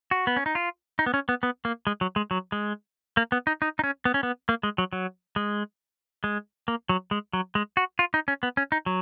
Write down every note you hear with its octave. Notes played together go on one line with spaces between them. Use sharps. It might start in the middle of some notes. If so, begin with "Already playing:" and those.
F#4
B3
C#4
D#4
F4
D#4
B3
C#4
B3
B3
A#3
G#3
F#3
G#3
F#3
G#3
A#3
B3
D#4
D#4
D#4
C#4
B3
C#4
B3
A#3
G#3
F#3
F#3
G#3
G#3
A#3
F#3
G#3
F#3
G#3
F#4
F4
D#4
C#4
B3
C#4
D#4
F#3